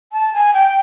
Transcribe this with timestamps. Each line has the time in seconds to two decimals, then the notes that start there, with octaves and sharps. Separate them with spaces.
0.12 A5
0.34 G#5
0.54 G5